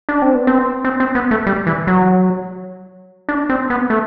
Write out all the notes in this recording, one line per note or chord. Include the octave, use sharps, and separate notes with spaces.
D4
C4
B3
C4
C4
C4
B3
A3
G3
E3
F#3
D4
C4
B3
A3